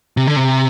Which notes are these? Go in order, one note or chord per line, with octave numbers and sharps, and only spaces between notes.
C3
D3
C3